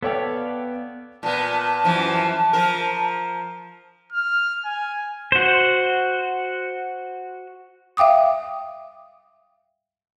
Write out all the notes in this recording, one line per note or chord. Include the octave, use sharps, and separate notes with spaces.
B3 A4 C#5 D5 F5 G5
A#2 B3 A5
F#2 E3 F3
F3 A#4
F6
G#5
F#4 C5
E5 F5 G5 D6 D#6